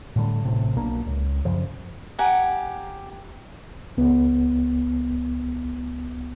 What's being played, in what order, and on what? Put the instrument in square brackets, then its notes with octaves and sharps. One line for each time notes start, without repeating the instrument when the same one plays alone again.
[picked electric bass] A2 D3 G3
A1 A2 C3
B1 B2 A#3 D4
C#2
F#2 C#3 F3
[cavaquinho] G4 F#5 G#5 A#5
[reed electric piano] C#2 B3